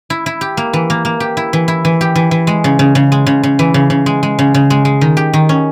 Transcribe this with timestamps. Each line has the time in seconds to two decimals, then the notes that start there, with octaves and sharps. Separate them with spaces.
0.10 E4
0.26 E4
0.41 G4
0.57 A#3
0.73 E3
0.90 A#3
1.05 A#3
1.20 G4
1.37 E4
1.53 E3
1.68 E4
1.85 E3
2.01 G4
2.16 E3
2.31 E3
2.47 G#3
2.64 C#3
2.79 C#3
2.95 C#3
3.12 G#3
3.27 C#3
3.43 C#3
3.59 E3
3.74 C#3
3.90 C#3
4.06 G#3
4.23 G#3
4.39 C#3
4.54 C#3
4.70 G#3
4.85 G#3
5.01 D#3
5.17 G4
5.34 D#3
5.49 C#4